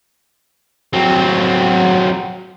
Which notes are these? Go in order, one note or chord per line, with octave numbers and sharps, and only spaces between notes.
F#3 C4